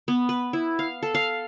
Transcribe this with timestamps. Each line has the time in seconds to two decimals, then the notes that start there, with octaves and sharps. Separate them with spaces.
0.08 B3
0.29 B4
0.53 E4
0.79 F5
1.03 A4
1.14 F5